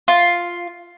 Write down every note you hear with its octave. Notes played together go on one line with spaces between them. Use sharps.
F4